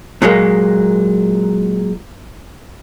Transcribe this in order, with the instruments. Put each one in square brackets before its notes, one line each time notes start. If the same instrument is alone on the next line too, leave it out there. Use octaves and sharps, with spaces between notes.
[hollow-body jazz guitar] A#2 F#3 G#3 A#3